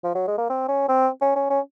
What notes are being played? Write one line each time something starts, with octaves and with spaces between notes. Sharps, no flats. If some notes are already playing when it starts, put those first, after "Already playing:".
F3
F#3
G#3
A#3
C4
C#4
C4
C#4
C#4
C#4